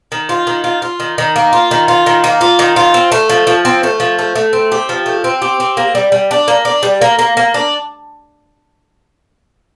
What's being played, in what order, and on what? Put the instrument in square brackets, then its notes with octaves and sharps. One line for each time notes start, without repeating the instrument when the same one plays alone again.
[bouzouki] D#3
F4
D#3
F4
F4
D#3
D#3
A#3
F4
D#3
F4
D#3
A#3
F4
D#3
F4
C4
A3
F3
F3
C4
A3
F3
A3
A3
C4
G4
F3
A3
C4
G4
C4
A#3
G3
G3
D4
A#3
D4
G3
A#3
A#3
A#3
D4